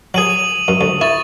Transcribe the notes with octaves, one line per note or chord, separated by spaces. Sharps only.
F#3 G#4 D#6 D#7 F#7
F#2
D2
E4 C#6 A6